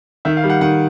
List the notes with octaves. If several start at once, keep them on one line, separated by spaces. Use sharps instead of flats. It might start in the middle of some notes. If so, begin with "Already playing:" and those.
D#3 E5
F5
G3
F#5
D#3 F#5